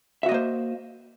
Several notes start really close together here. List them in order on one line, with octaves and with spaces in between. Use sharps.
E5 F#4 D#5 A#3 C5